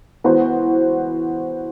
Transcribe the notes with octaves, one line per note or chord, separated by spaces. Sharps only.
E3 B3 F#4 C5